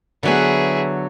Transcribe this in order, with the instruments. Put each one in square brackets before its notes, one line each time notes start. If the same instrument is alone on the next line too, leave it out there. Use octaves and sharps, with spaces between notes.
[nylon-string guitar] D3 F#3 B3 [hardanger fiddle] E4 G#4